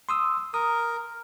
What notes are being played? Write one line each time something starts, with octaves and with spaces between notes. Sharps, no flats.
C6 D#6 E6
A#4 D#6